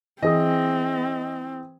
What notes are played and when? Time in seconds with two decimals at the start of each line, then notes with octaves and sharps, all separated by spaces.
0.22 E3 C4 G#4 D#5 D#6